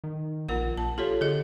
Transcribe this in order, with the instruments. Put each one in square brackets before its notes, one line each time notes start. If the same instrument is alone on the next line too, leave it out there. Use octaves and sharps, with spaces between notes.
[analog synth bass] D#3
[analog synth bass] A#1 [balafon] F4 A#4 F#5
[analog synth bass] A#1 [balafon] A5
[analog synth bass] F4 [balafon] G4 A4 C#5
[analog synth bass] D3 [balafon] G#4 D#5